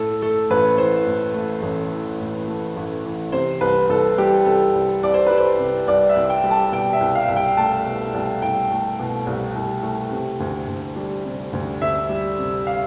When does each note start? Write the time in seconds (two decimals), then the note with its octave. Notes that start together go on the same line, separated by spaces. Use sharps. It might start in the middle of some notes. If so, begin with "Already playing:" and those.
Already playing: A2 A4
0.22 A3 A4
0.50 A1 B4
0.78 E3 C5
1.07 A2
1.34 A3
1.63 A1
1.91 E3
2.20 A2
2.48 A3
2.76 A1
3.05 E3
3.32 C3 C5
3.61 C2 B4
3.89 C2 A4
4.18 G3 G4
4.46 C3 A4
4.75 C2
5.03 C2 D5
5.14 C5
5.27 G3 B4
5.38 C5
5.59 C3
5.88 C2 D5
6.09 E5
6.16 C2
6.30 G5
6.44 G3
6.51 A5
6.72 B2 G5
6.93 E5
7.01 C2
7.15 F5
7.29 C2
7.37 G5
7.57 A3 A5
7.86 B2
8.14 C2
8.42 C2 G5
8.71 A3
8.99 B2
9.27 C2
9.55 C2
9.83 A3
10.11 C3
10.40 D2
10.68 D2
10.96 G3
11.25 C3
11.53 D2
11.82 D2 E5
12.09 G3
12.39 C3
12.67 F5